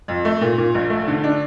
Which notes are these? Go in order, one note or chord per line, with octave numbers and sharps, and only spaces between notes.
F2
A3
A#2
A#2
A#1
A3
D3
D4